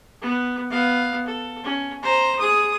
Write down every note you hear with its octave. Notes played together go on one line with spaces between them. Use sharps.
B3
B3 F5
A4
C#4
C5 A#5
G#4 D#6